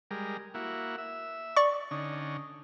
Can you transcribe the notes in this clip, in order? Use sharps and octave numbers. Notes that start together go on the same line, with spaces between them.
G3 G#3 A#4
A#3 E4 F#4
E5
D5 C#6
D3 C#4 D#4